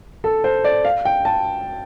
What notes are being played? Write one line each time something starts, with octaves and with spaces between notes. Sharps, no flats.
A4
C5
D5
F5
G5
A5